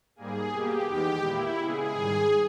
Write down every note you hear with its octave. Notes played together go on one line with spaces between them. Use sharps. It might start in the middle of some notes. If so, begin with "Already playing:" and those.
G#2 G3 A#3 G#4
B2 A#3 G4
E2 D#3 G#3 B3 G4
A#2 A#3 E4
C#3 G#3 B3 G#4
G#2 D#3 G3